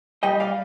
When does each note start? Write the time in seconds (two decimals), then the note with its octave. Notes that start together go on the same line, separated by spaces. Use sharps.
0.23 G3 D#5 G5
0.40 D5 F5